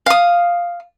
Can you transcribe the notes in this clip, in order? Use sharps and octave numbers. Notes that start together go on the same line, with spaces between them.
F5 D#6